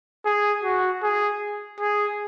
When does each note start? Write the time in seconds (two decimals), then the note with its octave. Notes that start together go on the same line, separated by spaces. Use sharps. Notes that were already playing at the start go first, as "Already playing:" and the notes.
0.26 G#4
0.64 F#4
1.03 G#4
1.80 G#4